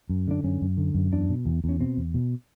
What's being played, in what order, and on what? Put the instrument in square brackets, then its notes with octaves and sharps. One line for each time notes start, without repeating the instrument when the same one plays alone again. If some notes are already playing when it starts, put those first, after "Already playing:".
[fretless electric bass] F#2
D3 D4
F#2 C#4
F#2
D3
F#2
E2 D4
B2
E2
E2
C#4
B2 C4
E2
B2